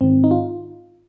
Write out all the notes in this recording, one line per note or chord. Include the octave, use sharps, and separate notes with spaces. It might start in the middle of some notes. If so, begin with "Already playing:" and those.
G#2 D#3 C4
D#4
F4